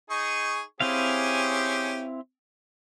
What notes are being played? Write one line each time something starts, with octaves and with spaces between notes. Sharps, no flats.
D#4 G#4 C#6
C4 C#4 E4 G4 G#4 F5